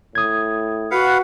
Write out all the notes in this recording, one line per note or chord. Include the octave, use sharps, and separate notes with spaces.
A2 D#6 G#6
F#4 B4 F5 F#5